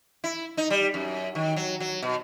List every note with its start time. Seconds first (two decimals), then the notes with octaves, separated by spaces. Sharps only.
0.24 E4
0.57 D#4
0.70 G3
0.94 F#2
1.35 D#3
1.56 F#3
1.80 F#3
2.02 B2